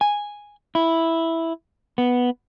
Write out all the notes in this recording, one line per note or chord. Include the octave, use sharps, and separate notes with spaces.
G#5
E4
B3